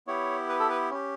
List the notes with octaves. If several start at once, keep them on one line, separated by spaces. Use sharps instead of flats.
B3 E4 G4 C#5
B4
A4
B4
C#4 G4